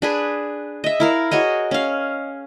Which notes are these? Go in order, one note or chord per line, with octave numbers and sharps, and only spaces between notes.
D4 G#4 B4
D#5 E5
E4 A#4 F5
F#4 G#4 C#5 D#5
C#4 F5